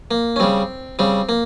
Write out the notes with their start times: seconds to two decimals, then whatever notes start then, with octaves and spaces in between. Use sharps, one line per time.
0.11 A#3
0.36 C#4
0.40 C#3 G3 C4
0.99 C#3 G3 C4
1.29 A#3